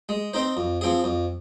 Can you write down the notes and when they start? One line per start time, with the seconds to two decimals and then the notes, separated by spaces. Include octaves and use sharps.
0.09 G#3
0.33 C4 D#4 C5
0.57 F2
0.81 F3 C4 G#4
1.04 F2